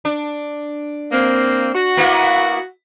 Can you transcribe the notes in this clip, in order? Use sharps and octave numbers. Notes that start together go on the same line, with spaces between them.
D4
A#3 C4
F#4
A#3 B3 E4